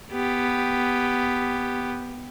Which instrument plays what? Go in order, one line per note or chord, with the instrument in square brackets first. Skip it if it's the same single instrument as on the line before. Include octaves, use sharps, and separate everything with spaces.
[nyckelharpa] B3 G4